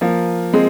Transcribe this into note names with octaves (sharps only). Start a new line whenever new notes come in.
F3 A#3
G#3 C4